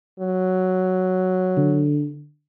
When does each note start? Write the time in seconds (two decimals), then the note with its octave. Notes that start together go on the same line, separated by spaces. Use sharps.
0.20 F#3
1.57 D3